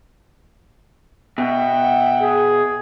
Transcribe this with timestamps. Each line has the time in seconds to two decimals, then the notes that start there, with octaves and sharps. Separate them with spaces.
1.38 B2 E5 F#5 G5
2.21 G#4